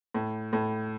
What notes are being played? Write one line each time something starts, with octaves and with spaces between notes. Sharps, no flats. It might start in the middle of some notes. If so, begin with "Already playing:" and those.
A2
A2